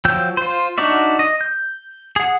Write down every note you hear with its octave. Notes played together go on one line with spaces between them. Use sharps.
F3 F#3 G5 E6 G6
F4 C5
D4 D#4 F#4 D5 E5
D#5
G6
G#4 F#5